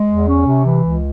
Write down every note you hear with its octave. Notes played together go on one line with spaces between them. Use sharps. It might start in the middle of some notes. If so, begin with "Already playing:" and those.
Already playing: G#3
E2
C#4
C3
E3
C#2